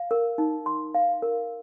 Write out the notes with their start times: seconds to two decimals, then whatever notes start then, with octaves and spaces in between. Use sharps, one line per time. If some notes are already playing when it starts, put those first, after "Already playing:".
Already playing: F5
0.11 A#4
0.38 D#4
0.66 C6
0.95 F5
1.22 A#4